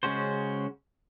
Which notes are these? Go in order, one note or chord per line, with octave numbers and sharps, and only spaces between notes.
C#3 G#3 C#4 F#4 C5